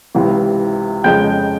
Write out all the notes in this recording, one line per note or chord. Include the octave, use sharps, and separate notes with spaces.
C#2 C3 E3
F2 C#3 F3 G#3 G5 G6